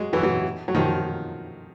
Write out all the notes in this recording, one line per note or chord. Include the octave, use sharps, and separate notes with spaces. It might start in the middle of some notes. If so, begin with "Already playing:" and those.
Already playing: F#3 G#3
E3 F#3
E3 F#3
F#3
D#3 F3